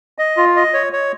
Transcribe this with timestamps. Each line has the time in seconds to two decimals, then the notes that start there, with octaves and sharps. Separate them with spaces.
0.19 D#5
0.37 F4
0.56 D#5
0.74 C#5
0.93 C#5